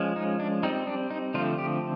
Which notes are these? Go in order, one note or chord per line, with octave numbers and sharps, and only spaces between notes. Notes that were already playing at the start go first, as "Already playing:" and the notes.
Already playing: F3 G#3 C#4
D#4
D4
G3 C4 D#4
D4
D#4
D3 F3 A3 C4 F4
G4